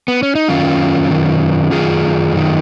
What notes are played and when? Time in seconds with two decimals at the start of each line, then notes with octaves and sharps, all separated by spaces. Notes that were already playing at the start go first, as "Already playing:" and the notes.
0.08 B3
0.23 C#4
0.35 D#4
0.49 F#2 D#3 C#4 F4
1.10 F#2 D#3
1.71 F#2 D#3 F4 G#4
2.32 F#2 D#3